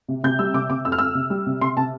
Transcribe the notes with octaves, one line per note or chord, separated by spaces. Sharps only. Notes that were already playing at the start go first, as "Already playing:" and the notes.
C3
C3 G6
G3 E6
C3 D6
C3 D6
F2 E6
F6
F2 E6
C3
G3
C3
C3 C6
C3 A5